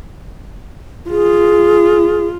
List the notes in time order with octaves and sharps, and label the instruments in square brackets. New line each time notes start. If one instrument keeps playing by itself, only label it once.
[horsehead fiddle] F4 [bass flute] G#4